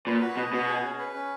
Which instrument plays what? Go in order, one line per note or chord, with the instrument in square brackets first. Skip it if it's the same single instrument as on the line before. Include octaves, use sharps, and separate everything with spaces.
[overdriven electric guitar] A#2 [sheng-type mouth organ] B4
[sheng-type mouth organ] F#4
[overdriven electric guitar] B2 [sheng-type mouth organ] D#5
[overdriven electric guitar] B2 [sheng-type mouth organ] F#4
[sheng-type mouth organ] G#4
C#4
B4
C#4